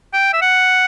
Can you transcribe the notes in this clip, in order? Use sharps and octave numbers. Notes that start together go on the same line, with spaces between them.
G5
E5
F#5